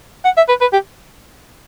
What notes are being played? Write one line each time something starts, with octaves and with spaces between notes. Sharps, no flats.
F#5
E5
B4
B4
G4